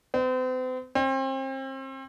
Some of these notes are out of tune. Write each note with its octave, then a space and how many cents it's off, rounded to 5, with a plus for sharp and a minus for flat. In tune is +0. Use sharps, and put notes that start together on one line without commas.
C4 -40
C4 +35